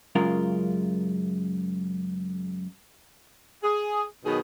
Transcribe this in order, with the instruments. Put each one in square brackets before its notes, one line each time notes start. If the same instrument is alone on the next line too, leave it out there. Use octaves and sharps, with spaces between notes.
[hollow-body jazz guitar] F#2 C#3 G#3 F4 A#4
[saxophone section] G#4
B2 D#3 F#3 B3 D#4 G#4